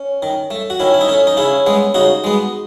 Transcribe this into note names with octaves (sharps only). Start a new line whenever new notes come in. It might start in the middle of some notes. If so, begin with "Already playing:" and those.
Already playing: C#4
D#3
A3
F#4
D#3 C#4 E4
E4
D#4
A3 C#4
D#4
C#3 C#4 E4
G#3 B3
C#3 D#4 F#4
G#3 B3